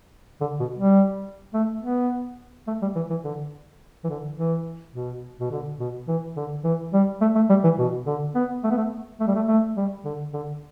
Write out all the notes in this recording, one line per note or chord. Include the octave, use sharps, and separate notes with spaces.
D3
B2
G3
A3
B3
A3
G3
E3
E3
D3
E3
D3
E3
B2
B2
D3
B2
E3
D3
E3
G3
A3
A3
G3
E3
B2
D3
B3
A3
B3
A3
A3
G3
A3
A3
G3
D3
D3